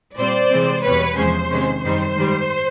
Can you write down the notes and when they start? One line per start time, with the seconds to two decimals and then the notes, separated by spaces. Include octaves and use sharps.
0.17 A#2 G3 C4 C5 D5
0.51 C3 E3 G#3 C4
0.83 E2 B2 G3 B4 C#5
1.17 E2 C3 F3 G#3 C#4 C5
1.50 C3 D#3 G#3 C#4
1.83 F#2 D#3 G3 C5
2.16 G#2 D#3 G3